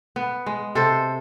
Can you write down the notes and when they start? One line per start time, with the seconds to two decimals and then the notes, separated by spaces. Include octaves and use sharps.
0.16 B3
0.46 G#3
0.75 C3 A4 C5